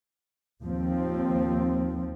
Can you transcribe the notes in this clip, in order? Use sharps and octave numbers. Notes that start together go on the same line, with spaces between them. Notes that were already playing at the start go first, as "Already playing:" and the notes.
D#2 F3 C4